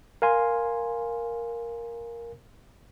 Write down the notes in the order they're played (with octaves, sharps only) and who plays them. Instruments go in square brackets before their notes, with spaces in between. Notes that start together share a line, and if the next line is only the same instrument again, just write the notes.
[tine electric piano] A#4 F5 G#5 C6